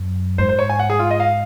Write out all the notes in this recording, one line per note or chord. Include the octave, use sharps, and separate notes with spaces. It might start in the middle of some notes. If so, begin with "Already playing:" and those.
Already playing: F#2
G#2 C5
C5
C#5
G#5
F#5
G#4
F4
D#5
F5